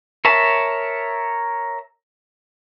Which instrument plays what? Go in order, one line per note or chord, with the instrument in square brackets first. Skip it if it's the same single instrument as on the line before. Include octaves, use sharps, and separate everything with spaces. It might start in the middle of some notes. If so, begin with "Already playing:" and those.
[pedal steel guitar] A#4 C#5 E5 A5